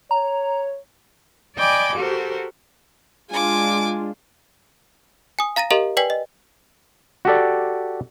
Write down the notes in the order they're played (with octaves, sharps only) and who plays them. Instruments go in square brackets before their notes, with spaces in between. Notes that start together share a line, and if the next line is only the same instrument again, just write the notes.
[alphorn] C#5 [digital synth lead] A#5
[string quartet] D5 D#5 G5 G#5 B5 D6
F#4 G4 A4 A#4 C5
[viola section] G#3 D4 F4 [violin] G#5 D6
[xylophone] G#5 D#6
F5 A#5 A6 A#6 D#7
G4 A#4 D#5 F5 A#5 F#7
B4 D5 G5 G#5 B6 F#7
D#5
[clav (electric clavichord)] F#4 G4 A4 D5